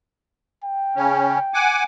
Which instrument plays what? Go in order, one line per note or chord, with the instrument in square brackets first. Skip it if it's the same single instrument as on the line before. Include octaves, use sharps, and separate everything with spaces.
[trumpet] G5
[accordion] C#3 C#4
F#5 G#5 D6